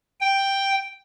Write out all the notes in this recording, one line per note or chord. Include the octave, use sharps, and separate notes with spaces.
G5